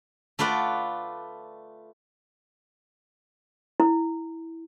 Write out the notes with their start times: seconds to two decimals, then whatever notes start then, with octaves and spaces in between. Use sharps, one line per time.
0.39 A3 F4 B4 D5 F#5
3.80 E4